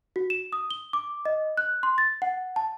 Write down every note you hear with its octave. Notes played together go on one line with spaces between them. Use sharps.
F#4
E7
D#6
G7
D6
D#5
F#6
C6
A6
F#5
A5